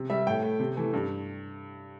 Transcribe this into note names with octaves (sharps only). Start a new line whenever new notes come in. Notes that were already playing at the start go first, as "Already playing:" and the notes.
Already playing: C3
G3 E5
A2 G5
A3
C3
E3 A3
G2